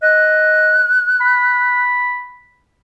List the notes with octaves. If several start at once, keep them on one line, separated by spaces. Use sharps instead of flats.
D#5 F#6
B5